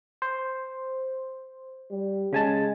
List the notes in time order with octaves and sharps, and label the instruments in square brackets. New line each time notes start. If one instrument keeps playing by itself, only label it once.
[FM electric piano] C5
[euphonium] G3
[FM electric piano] C#3 G#5 A5 [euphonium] G#3